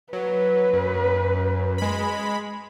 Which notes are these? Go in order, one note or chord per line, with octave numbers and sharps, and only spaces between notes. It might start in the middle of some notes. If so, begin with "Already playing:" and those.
F#3 B4
F#2
G#3 B5